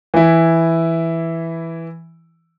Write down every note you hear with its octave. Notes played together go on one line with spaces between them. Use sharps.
E3 E4